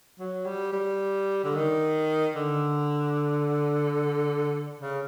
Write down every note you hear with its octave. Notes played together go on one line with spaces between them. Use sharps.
F#3
G3
G3
D3
D#3
D3
C#3